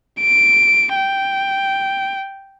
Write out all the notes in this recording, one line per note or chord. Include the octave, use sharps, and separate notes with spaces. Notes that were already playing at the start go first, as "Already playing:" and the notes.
D7
G5